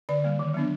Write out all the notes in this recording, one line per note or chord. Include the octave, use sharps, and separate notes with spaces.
D3 D5
G3 A#3
D#3
F#3 B3 D4